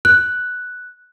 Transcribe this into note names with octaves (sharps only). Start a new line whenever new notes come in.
F#6